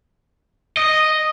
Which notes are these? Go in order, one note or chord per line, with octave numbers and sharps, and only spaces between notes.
D#5